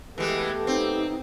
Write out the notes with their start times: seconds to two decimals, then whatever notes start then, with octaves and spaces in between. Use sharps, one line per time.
0.18 E3 G#3 A3 B3 G4 A4
0.67 C4 D#4